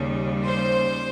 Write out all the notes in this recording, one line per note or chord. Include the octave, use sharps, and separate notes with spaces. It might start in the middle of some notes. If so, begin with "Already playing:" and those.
Already playing: D#2 C#3 G3
C5